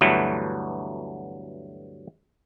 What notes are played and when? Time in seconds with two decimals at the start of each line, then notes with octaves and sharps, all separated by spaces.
0.01 D2 G2 E3 F#3 A3 B3